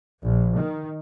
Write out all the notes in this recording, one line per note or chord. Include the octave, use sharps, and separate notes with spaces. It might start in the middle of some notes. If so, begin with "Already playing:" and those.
A#1
D#3